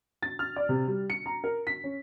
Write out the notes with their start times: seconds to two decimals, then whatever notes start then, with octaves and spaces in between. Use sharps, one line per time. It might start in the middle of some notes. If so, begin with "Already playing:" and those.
0.23 A6
0.39 F6
0.56 D5
0.69 C3
0.88 G3
1.10 C#7
1.26 A#5
1.44 A#4
1.67 B6
1.84 C#4